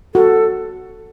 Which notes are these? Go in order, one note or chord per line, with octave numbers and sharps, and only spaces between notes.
F#4 A4